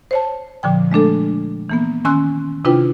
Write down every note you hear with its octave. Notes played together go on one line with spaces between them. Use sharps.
C5 C#5 A5
A#2 D3 F3 G5
G#3 A3 D4 A4
E3 A#3 B3
D#3 C#4 G#5 C6 E6 F#6
C3 D4 E4 F4 B4 G5